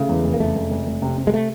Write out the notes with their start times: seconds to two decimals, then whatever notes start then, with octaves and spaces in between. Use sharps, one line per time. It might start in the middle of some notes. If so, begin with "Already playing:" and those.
Already playing: C#3 A3
0.09 E2
0.24 F1
0.34 A#3
0.40 C#3 A3
0.55 F1
0.71 F1
0.87 F1
1.02 C3
1.18 C3
1.27 G#3
1.34 A3